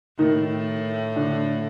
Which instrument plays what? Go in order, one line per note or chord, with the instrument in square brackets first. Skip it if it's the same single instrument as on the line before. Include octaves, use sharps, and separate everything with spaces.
[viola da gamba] A2 [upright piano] D#3 D#4
[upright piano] D3 D4